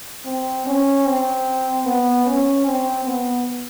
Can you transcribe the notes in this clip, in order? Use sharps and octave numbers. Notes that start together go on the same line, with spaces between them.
C4
C#4
C4
B3
C#4
C4
B3